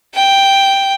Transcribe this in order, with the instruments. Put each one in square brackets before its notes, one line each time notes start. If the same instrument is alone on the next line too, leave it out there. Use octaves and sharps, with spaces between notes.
[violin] G5